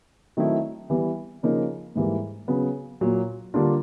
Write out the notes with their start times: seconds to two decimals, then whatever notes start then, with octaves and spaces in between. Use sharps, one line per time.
0.37 D#3 F#3 A3 C4 E4
0.90 E3 G3 B3
1.43 C#3 F3 A#3 D#4
1.96 G#2 E3 G3 A#3
2.48 C#3 F#3 B3
3.01 A#2 F#3 A#3
3.54 D3 G3 A#3 D4 F4